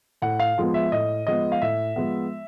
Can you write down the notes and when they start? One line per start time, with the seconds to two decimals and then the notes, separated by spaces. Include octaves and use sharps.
0.22 A2 F#5
0.40 F5
0.58 F3 G#3 B3
0.74 E5
0.92 A2 D#5
1.27 F3 G#3 B3 D#5
1.52 F5
1.62 A2 E5
1.96 F3 G#3 B3